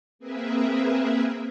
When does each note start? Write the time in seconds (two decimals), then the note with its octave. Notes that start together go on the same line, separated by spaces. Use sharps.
0.19 A#3 C4 G#4 A#4 B4 E5